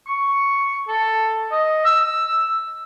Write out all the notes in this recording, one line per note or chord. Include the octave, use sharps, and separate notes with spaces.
C#6
A4
D#5
E6